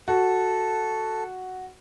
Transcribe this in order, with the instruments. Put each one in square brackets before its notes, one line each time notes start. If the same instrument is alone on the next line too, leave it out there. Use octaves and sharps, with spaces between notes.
[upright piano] F#4 [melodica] A4